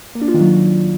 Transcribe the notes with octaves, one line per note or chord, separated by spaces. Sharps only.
A#3
D4
F4
D#3
F#3